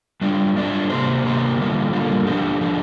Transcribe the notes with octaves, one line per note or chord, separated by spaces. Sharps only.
G3 D4 F4 D5
G3 D4 F4 D5
C3 A#3 G4 C5
C3 A#3 G4 C5
D3 G3 A#3 F4
D3 G3 A#3 F4
D3 F3 D4 G4
D3 F3 D4 G4